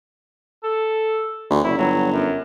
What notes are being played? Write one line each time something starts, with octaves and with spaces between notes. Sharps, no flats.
A4
D2
F#1 E4
G1 F#3
F#2